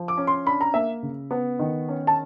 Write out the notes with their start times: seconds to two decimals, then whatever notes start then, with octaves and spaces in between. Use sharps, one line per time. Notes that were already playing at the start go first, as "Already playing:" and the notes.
Already playing: F3
0.08 D6
0.17 C#4
0.27 C6
0.46 D4 B5
0.61 A#5
0.74 A#3 E5
1.03 C#3
1.31 B3
1.59 D#3
1.89 C#4
2.07 A5